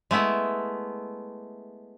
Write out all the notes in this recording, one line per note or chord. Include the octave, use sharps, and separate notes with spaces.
G#3 A3 B3 E4